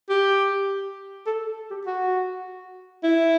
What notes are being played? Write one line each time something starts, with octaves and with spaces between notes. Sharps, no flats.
G4
A4
G4
F#4
E4